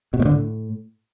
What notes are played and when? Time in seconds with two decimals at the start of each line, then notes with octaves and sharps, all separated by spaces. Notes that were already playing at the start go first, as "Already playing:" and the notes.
0.14 B2
0.20 A2
0.25 D3
0.31 A2